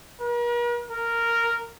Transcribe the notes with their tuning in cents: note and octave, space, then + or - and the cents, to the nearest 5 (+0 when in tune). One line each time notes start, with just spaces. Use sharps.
A#4 +45
A#4 -5